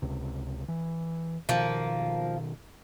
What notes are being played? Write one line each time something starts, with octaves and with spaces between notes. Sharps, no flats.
C#2 C3
E3
B2 D#3 F3 A#3